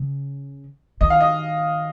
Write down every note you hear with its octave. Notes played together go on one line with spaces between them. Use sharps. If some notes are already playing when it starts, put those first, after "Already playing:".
Already playing: C#3
D#3 D#5
F5
D#5